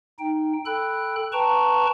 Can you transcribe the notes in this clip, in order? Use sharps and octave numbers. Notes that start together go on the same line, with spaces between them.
D#4 G5
A4 G5 B5 F#6
B4 G5 A5 A#5 C#6